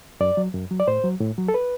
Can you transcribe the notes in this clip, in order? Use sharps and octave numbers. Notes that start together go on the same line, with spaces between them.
F#2 D5
F#3
F#2
F#3
D5
A2 C5
F#3
A2
F#3
A4
B4